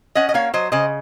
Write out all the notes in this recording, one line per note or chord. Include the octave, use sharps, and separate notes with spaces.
C#4 D#5 F#5
D#5
A#3 C#5 F5
F#3 C5 D#5
C#3 C5 D#5